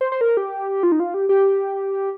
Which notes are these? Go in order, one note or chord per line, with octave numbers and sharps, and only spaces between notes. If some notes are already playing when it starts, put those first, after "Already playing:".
C5
C5
A#4
G4
F4
D#4
F4
G4
G4